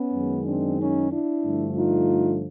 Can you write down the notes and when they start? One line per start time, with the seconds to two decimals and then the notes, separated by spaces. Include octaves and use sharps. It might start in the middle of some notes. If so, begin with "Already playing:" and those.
Already playing: B3 C#4
0.13 F#2 D#3 G#3
0.46 C4 D4
0.79 C#4 D#4
1.12 D4 E4
1.44 G2 D3 F3 A3
1.76 D#4 F4